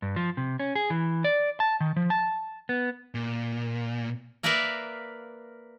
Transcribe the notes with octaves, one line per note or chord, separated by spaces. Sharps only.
G2
F3
C3
C#4
G#4
E3
D5
A5
D#3
F3
A5
B3
A#2
A#3 A#4 B4 D5 E5 F5